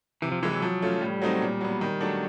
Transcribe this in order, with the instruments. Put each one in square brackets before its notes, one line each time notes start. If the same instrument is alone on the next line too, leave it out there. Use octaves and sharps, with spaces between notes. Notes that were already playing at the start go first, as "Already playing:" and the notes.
[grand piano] C3 [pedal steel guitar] E3
[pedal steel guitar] F3
[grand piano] E3 G#3 [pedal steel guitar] F3
[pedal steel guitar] F#3
[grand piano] F3
A3 C#4 F4
[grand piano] A2 [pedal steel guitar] G3
[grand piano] F#3 A3 C4 D#4
A#2
F#3 B3
D#3
F#3 A3 D4